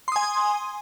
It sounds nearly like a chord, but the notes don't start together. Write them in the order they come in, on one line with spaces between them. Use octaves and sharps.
C6 D#6 G#5